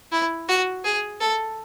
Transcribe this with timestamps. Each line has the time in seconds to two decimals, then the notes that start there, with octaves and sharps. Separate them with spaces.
0.12 E4
0.49 F#4
0.84 G#4
1.21 A4